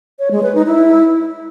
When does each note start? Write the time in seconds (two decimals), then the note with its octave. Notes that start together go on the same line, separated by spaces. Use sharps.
0.19 C#5
0.31 G#3
0.43 B4
0.55 D#4
0.67 E4